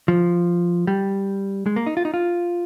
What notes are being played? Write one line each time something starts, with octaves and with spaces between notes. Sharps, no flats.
F3
G3
G#3
A#3
D#4
F4
D#4
F4